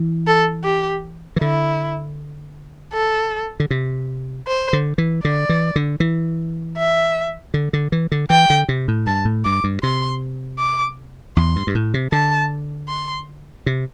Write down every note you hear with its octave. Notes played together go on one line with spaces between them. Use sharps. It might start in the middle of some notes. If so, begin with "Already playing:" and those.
Already playing: E3
A4
G4
E3
D3 E4
A4
D3
C3
C5
D3
E3
D3 D5
E3
D3
E3
E5
D3
D3
E3
D3
E3 G5
D3
C3
A2
G2 A5
A2
G2 D6
G2
C3 C6
D6
E2 C6
G2
G2
A2
C3
D3 A5
C6
C3